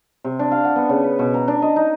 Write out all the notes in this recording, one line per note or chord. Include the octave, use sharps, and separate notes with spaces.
C3
D4
F5
F#5
B3
C#3
B4
B2
A#5
D4
D#5
D#4